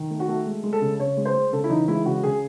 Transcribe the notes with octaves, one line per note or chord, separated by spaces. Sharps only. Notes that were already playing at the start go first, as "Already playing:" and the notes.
Already playing: D#3
A3
F#4
A3
G#3
G#3
A4
C#3
C#3 C#5
G#3
C5
G#3
C#3 A4
E4
E3 D#4
G#3 E4
C#3 F#4
C#3 G#4